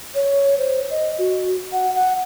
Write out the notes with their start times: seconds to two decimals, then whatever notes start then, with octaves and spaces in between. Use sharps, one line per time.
0.15 C#5
0.58 C5
0.91 D#5
1.18 F#4
1.72 F#5
1.95 F#5